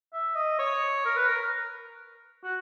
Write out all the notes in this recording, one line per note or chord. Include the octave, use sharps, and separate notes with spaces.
E5
D#5
C#5
A#4
B4
A#4
F#4